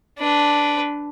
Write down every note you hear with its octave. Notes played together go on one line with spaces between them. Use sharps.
D4 B4